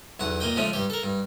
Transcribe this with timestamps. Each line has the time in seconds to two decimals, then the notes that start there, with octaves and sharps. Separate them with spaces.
0.20 B1 E2 B2 F#5
0.40 A#2 A#3 D#5 G5
0.56 C#3 F3 G#3 A3 C#4
0.73 G2 G4
0.90 A4 A#4
1.03 G2